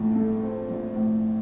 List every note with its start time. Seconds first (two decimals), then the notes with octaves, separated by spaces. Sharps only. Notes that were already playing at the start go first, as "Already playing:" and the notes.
Already playing: A#1 A2
0.16 A3
0.43 C4
0.70 A#1
0.96 A2